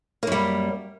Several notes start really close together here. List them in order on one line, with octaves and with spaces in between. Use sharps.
A#3 F#2 G3